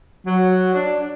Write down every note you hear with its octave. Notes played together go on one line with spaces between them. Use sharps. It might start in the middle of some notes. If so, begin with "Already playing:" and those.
F#3
D4